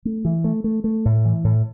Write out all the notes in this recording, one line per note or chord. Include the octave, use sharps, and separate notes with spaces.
A3
E3
A3
A3
A3
A2
E3
A2